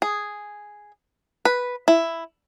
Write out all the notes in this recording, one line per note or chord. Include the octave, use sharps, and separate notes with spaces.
G#4
B4
E4